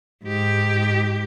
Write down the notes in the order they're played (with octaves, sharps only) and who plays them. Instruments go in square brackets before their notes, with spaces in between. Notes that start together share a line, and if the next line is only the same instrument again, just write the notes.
[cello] G#2 G4